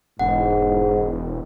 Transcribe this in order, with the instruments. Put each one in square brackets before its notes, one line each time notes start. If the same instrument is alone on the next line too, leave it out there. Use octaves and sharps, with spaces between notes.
[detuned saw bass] E1 [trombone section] G#2 [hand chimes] F#5